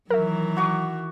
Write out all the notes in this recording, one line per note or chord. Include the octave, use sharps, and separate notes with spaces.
D#3 E3 F#3 A#4 E5
F#4 C#6 D6